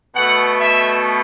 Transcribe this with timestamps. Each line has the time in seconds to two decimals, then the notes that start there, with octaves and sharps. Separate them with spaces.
0.15 B2 A3 F#5
0.61 E5